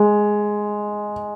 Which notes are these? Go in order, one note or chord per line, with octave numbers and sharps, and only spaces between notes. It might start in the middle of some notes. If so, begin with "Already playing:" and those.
Already playing: G#3